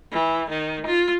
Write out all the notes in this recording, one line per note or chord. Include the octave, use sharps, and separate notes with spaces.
E3
D#3
F4